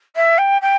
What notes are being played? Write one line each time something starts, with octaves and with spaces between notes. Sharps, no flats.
E5
G5
G5